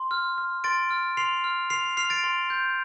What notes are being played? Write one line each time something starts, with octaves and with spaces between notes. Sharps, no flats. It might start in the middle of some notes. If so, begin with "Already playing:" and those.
Already playing: C6
F6
F6
C6 A6 D7
F6
C6 C7 F7
F6
C6 C7 F7
F6 C7 F7
A6 D7
C6
G6